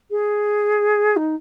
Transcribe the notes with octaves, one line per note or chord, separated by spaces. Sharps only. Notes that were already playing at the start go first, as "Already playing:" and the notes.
G#4
D#4